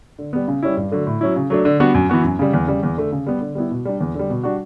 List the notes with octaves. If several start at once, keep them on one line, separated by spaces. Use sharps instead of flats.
D3
G3 B3
C#3
G3 C#4 E4
G2
D3 F#3 A3
A2
F#3 C#4 E4
C#3
F#3 A3 D4
D3
G3 B3 D4 F#4
F#2
E3 B3 F#4
F#2
C#3 G3
E2
C#3 G3
E2
D3 A3
C#3
G3 B3
D3
G3 B3 E4
B2
G3 D4
E2
D3 G3
B2
G3 D4 F#4